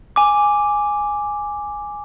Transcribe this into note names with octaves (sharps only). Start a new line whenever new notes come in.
G#5 D6